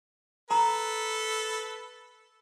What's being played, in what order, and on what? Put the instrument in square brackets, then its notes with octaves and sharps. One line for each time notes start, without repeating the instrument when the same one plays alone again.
[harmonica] A4 B4 [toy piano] A#5